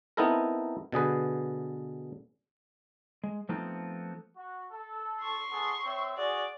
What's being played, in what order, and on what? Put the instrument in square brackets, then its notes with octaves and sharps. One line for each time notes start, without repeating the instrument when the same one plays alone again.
[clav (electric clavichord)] B3 C4 D#4 E4 A4 A#4
B2 D3 G#4 B4
[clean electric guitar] G#3
F3 A3 B3 C4 D#4 F4
[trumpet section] F#4
A4
[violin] C6 C#6
[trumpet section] B3 G#4 A4
C4 C#5 E5
[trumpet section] F#4 G#4 [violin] D5